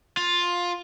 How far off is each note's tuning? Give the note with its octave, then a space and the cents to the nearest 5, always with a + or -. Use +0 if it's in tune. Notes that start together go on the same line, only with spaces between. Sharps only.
F4 +10